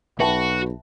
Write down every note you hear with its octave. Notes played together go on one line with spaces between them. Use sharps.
B1 F#4 B4 E5 G5 A5